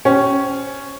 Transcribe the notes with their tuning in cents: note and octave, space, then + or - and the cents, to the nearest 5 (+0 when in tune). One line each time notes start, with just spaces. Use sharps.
C#4 +0 G4 -25 C5 +5